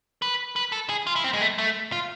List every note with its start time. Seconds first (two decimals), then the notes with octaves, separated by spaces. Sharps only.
0.22 B4
0.56 B4
0.72 A4
0.89 G#4
1.07 F4
1.16 E4
1.24 C4
1.33 G#3
1.41 A3
1.58 A3
1.92 F4